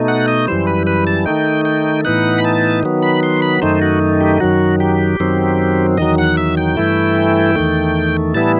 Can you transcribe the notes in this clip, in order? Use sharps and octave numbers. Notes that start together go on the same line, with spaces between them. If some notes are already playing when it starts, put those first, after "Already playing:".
Already playing: B2 A3 D#4
F#5
D#5
F#2 E3 G3 C5
B4
B4
A5
D#3 A3 D#4 G5
G5
A2 E3 B3 D#4 F#5
B5
A5
D#3 F#3 B3
B5
C6
B5
F#2 D#3 A3 D#4 C5
F#4
G4
F#2 D#3 F#3 F#4
G4
F#2 D#3 F#3 C4
E2 D#3 F#3 D#5
F#5
E5
G5
G2 E3 A3 E4
E2 D#3 A3
A2 E3 G3 B3 E4 A5